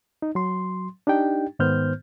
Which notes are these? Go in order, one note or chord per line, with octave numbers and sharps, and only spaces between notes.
D#4
F#3 C6
D4 D#4 G4 G5
G#2 D#3 B3 C5 F6 G6